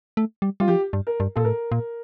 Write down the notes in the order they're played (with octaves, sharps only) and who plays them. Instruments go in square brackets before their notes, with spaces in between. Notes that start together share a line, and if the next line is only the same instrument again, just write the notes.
[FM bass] A3
G3
[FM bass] G3 [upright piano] F4
[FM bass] F3 [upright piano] G4
[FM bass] G2
[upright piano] A#4
[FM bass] G2
[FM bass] A#2 [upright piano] A4
[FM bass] A2 [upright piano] A#4
[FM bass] A#2